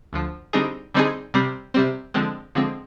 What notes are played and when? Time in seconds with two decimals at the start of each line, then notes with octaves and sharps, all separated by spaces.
0.13 D2 D3 F3
0.53 D3 G3 C4 D#4 G#4
0.94 D3 G3 C4 D#4 G#4
1.34 C3 G3 C4
1.74 C3 G3 C4
2.14 D3 F3 G#3 C4
2.55 D3 F3 G#3 C4